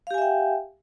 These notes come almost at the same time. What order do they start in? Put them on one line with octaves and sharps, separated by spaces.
F5 G4 G#5 E5 G5